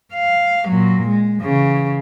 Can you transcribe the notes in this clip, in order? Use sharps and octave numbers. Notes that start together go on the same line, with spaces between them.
F5
A#2 F#3
G#3
C#3 E3